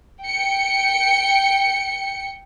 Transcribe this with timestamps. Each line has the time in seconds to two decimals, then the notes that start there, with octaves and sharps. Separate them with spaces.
0.22 G5 C#7